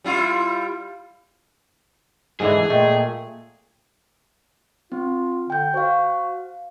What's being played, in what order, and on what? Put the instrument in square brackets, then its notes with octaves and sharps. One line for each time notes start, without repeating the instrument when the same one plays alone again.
[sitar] G3 E4 F4
[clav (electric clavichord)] G#2 D3 E3 [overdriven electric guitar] G#4
[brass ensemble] A#2 [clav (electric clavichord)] A3 [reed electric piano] D#5 G5
[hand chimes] C4 [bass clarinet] F4
[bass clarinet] D3 [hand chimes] G5 G6
[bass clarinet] F#4 [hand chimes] C5 F5